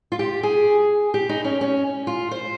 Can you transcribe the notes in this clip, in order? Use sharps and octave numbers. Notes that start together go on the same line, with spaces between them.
F4
G4
G#4
G4
D#4
C#4
C#4
F4
C5